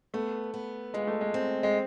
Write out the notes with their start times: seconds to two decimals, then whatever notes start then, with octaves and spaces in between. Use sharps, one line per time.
0.14 A3 B3
0.54 B3
0.94 A#2 G#3
1.07 A3
1.21 G#3
1.34 C4
1.63 G#3